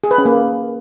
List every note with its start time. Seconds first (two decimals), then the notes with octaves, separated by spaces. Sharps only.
0.04 G#4
0.11 B4
0.18 C#4
0.25 A#3